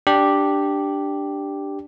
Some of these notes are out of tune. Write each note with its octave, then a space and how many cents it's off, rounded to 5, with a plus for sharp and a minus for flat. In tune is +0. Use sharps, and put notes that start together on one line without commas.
D4 +0 G4 +0